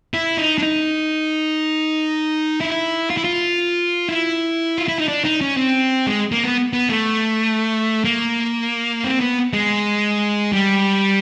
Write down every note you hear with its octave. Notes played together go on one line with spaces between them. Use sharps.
E4
D#4
D4
D#4
E4
F4
E4
F4
E4
F4
E4
D#4
D4
D#4
C#4
C4
G#3
A#3
B3
B3
A3
A#3
C4
B3
G#3
G3